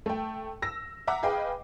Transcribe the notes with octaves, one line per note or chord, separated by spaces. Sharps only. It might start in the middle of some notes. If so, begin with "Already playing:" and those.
A3 G5
E6 A#6
E5 F#5 A#5 D6
G#4 B4 D#5 F5 G5